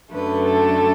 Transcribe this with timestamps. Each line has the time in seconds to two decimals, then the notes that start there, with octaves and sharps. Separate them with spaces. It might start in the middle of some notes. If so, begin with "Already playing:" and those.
0.12 F#2 D3 A3 B4
0.46 A4